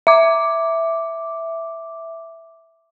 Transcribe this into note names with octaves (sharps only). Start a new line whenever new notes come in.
E5 D6